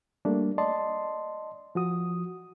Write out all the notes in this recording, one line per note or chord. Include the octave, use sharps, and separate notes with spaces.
G3 A3 A#3 D4
D5 D#5 A5 C6
F3 F#4 D#6